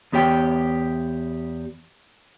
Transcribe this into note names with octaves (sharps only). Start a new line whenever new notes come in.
E2 B3 G4 C#5 G5